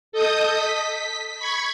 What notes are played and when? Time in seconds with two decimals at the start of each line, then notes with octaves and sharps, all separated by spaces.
0.12 A4 D#5 D#6 G6
0.56 B6
1.38 B5 C#6 G#6